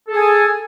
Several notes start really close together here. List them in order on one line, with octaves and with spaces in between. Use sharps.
A4 G#4 G#5